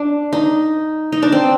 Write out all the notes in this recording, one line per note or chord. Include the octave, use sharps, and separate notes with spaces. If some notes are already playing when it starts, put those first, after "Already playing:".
Already playing: D4
D#4
D#4
D4
C4